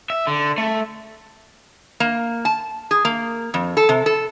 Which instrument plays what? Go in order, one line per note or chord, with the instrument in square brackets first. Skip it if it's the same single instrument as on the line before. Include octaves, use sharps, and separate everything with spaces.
[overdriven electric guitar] E5
D3
A3
[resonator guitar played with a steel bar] A#3
A5
G#4
A#3
F2
A4
C3
A4